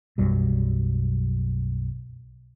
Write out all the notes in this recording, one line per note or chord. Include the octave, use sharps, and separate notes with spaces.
B1 F#2 F#3 G3